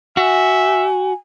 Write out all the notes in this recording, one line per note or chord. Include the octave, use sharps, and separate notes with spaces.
F#4 E5 G#5